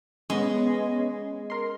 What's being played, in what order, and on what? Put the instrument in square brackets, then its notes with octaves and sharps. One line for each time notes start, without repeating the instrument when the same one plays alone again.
[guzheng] G#3 [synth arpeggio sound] B3 C#4
[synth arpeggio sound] A#4 C6